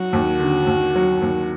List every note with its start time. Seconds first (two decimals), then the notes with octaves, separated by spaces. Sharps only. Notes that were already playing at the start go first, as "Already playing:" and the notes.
Already playing: F#3 F#4
0.13 D#2
0.40 D3
0.67 D#2
0.95 F#3
1.22 D#2